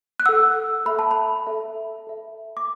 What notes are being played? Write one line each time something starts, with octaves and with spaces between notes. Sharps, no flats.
F#6
A4 F#5 E6
A4 E5 B5
A5
B5
A4 E5
A4 E5
D6